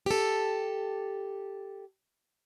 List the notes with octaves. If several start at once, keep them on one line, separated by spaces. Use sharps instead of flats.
G4 A4